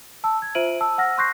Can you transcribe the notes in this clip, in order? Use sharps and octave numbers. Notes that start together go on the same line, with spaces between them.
A5 E6
G#6
F4 C5 E5 D7 D#7 F#7
A5 E6
F#5 E6 F6 A#6
C6 C#6 F#6 G6 A#6 C7